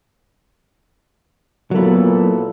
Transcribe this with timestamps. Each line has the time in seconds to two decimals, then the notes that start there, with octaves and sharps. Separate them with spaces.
1.71 A#2 F#3 B3 E4 A4